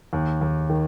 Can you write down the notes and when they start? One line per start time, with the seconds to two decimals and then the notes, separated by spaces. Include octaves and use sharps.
0.13 D#2
0.41 D#2
0.69 D#3